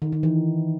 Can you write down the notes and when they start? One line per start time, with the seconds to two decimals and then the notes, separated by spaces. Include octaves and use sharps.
0.02 D#3
0.12 D#3
0.23 E3